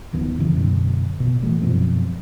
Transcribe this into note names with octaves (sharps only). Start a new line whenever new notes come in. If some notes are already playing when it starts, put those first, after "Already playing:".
D1 D#3 B3
F2 C#3 E3
F#2 B2 D3
B2
A#2 E3 G#3 A3
F#2 B2 F3 C4